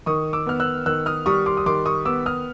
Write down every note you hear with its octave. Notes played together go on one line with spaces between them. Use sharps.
D#3 C#6 D#6
D6 E6
B3 F6
E6 F#6
D#3 E6 F#6
D#6 F6
G3 C#6 D#6
C6 D6
D#6
D#3 C6 D6
C#6 D#6
B3 D6 E6
D#6 F6